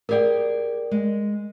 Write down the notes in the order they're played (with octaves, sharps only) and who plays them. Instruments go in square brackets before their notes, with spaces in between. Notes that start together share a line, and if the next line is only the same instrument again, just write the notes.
[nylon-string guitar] G4 G#4 G5 [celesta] A#4 D5
[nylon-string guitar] G#3